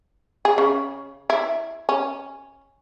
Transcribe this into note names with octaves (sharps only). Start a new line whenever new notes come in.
G#4
C#3
E4
C#4